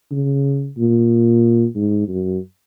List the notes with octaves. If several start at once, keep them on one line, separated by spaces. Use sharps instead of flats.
C#3
A#2
G#2
F#2